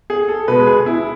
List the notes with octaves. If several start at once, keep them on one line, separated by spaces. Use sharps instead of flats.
G#4
A4
B2 G#3 B4
G#4
E4